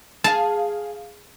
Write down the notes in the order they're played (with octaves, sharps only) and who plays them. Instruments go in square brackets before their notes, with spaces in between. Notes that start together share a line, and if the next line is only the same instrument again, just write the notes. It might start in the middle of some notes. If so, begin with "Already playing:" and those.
[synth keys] G#4 F5 [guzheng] A5